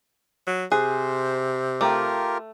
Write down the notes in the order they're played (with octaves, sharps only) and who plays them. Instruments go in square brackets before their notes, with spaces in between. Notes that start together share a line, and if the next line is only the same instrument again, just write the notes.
[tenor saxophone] F#3
[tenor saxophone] C3 [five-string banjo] G#4 [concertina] C5 [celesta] F#6
[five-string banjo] A3 [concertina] F4 G4 A#4 [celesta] G5 A#5 D6